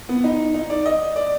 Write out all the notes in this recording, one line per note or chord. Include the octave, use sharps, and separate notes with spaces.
B3
D#4
D#4
D5
D#5
D5